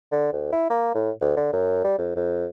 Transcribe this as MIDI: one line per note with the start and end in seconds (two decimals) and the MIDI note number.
0.12 0.30 50
0.32 0.47 38
0.52 0.65 64
0.70 0.93 58
0.95 1.11 45
1.21 1.32 38
1.36 1.52 50
1.53 1.82 42
1.84 1.95 55
1.98 2.16 41
2.16 2.46 41